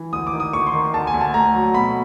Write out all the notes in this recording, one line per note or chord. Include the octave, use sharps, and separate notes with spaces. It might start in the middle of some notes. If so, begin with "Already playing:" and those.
Already playing: E3
D2 D#6
D6
D#3
D#6
D2 C#6
C6
D#3
D2 A5
G#5
D2
A5
A3 A#5
F#3
B2 B5